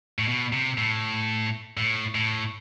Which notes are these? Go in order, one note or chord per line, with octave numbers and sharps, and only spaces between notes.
A2
B2
C3
A2
A2
A2